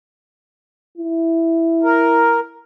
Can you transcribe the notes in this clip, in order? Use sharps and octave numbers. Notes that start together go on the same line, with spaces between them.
E4
A#4